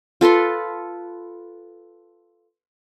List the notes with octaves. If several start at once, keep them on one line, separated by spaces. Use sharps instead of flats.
F4 A4 B4 C6